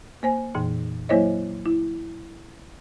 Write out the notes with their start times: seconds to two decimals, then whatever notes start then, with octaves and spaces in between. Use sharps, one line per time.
0.23 A#3 C5 G#5
0.55 F2 A#2 E3
1.09 F#3 A#3 E4 C5 C#5 D#5
1.66 E4